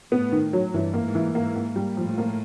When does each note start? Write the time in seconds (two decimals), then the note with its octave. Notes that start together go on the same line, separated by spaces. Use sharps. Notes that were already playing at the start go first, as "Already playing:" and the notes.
0.12 A2 B3
0.32 D#3
0.53 F#3
0.74 G2 E3
0.94 A#3
1.05 G#2
1.15 E3
1.35 G#2 A#3
1.55 A#3
1.76 G3
1.97 A2 F3
2.18 A#3